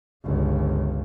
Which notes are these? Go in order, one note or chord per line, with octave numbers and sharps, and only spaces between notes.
G1 C#2